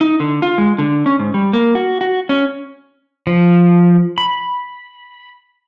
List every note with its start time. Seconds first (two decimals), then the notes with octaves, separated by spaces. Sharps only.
0.01 D#4
0.20 D3
0.42 F4
0.58 G#3
0.78 D3
1.06 C#4
1.19 G#2
1.34 G3
1.53 A#3
1.75 F#4
2.01 F#4
2.29 C#4
3.27 F3
4.18 B5